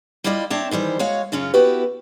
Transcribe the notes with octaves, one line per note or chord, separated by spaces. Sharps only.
G3 E4 F4 D5 D#5
C4 D4 C#5 E5 A5
D#3 E3 G3 C5
G#3 F#4 C#5 F5
F#2 C#3 C#4 F4
B3 E4 F#4 G4 B4